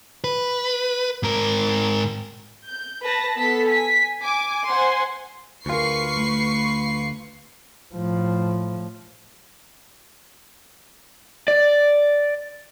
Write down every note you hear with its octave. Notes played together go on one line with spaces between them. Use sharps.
B4
G#2 A#4
G6
B4 A5 A#6
B3 A4 A5 B6
G#5 B6
G#5 D6
C5 F#5 G#5 C6
D2 F4 F#4 G#4 A#4 B4 C#6 C7
A3
A2 F3
D5